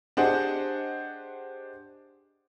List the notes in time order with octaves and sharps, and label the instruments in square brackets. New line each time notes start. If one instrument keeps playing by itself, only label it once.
[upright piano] D4 G4 G#4 C5 D#5 F#5